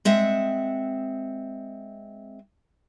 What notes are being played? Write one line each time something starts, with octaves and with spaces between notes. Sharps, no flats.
G#3 C4 E5 F#5